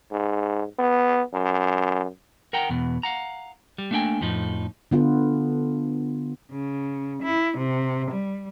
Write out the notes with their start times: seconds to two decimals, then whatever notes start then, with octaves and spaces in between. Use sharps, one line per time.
0.12 G#2
0.79 B3
1.34 F#2
2.53 A#4 F#5 G5 A#5
2.69 E2 B2
3.03 F5 F#5 A#5
3.78 G3
3.91 A3 A#3 D4 E5 G5 G#5
4.21 F2 A2 F3 D#4
4.91 D3 B3 F4
6.50 C#3
7.21 E4
7.57 C3
8.11 G3